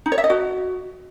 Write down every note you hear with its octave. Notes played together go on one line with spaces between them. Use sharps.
D#4
C#5
E5
D#5
F#4